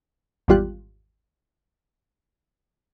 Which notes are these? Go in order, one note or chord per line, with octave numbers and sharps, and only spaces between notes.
G#1 E2 G3 F4 G4 F#6